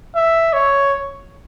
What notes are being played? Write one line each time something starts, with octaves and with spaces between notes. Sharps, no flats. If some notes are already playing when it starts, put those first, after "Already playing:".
E5
C#5